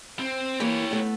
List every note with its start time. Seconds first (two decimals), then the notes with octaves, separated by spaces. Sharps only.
0.19 C4
0.60 E3 A#3 G4 C#5
0.91 A3 B3